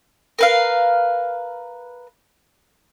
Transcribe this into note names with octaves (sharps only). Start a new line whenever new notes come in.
A#4 B4 F5